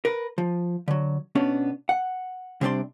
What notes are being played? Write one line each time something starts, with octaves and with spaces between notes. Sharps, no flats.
A#4 B4
F3
D3 F#3
B2 B3 C#4 D4
F#5
C3 G3 C4 D4 D5 C6